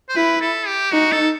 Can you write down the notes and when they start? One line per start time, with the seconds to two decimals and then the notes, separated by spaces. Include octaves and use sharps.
0.09 C5
0.16 E4 B4
0.41 A4
0.67 G4
0.92 D#4 F#4
1.12 A4